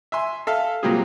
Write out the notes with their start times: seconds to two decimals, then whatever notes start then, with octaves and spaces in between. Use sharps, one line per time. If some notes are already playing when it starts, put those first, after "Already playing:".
0.12 E5 G#5 C6
0.47 A4 E5 F5
0.83 A#2 F#3 G3 C4 F4 G#4